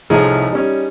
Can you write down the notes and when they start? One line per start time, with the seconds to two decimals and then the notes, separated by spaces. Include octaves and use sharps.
0.10 C2 A2 F3 D#4 G#4
0.52 G3 C#4